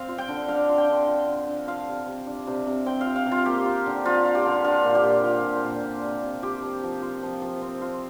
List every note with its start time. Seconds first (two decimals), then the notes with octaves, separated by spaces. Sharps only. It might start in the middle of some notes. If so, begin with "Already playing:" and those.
Already playing: C4 F5
0.08 F4
0.18 G5
0.28 D3
0.48 D4 F5
0.68 F4
0.78 G5
0.89 D3
1.07 F4
1.28 D3
1.48 D3
1.67 F4 F5
1.88 C3
2.07 C3
2.27 D4
2.47 C3
2.67 C3
2.86 C4 G5
3.01 F4 F5
3.16 F5
3.26 C3
3.32 F4
3.46 A#3 G4
3.65 F4
3.86 D3
4.05 C4 F4
4.25 F4
4.35 G4
4.45 D3
4.64 D4 F4
4.84 A#2
4.95 G4
5.04 A#2
5.24 F4
5.44 A#2
5.64 A#2
5.83 D4
6.03 C3
6.23 C3
6.43 F4 G4
6.63 F3
6.83 F3
7.02 F4
7.23 F3
7.42 F3
7.62 C4
7.81 F4